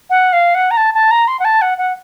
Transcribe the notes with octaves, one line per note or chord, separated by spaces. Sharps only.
F#5
F5
F#5
A#5
A5
A5
A#5
C6
F#5
A5
F#5
F#5